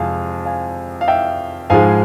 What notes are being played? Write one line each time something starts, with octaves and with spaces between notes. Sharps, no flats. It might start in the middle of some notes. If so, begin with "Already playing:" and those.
Already playing: F2 C3 F3 G#3 F5 G#5
F5 G#5
F5
E5 G5
G#2 F3 G#3 F5 G#5